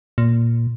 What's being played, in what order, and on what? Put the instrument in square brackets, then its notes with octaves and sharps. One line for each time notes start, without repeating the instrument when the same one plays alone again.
[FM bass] A#2